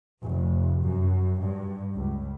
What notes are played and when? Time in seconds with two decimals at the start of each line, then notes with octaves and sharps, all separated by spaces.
0.23 F1
0.82 F#2
1.41 G2
1.96 C#2